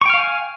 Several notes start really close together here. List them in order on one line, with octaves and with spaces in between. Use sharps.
C#6 G5 F6 F5 G#5